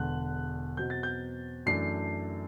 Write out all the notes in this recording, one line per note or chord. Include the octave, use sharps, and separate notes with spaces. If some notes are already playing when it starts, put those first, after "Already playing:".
Already playing: E1 E2 D3 F#6
E2 B2 F#3 C4 G6
A6
G6
F#2 E3 A3 D4 C7